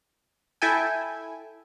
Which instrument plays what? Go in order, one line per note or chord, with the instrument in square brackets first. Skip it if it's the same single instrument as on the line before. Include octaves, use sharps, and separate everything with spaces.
[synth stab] E4 A4 E5 G5 G#5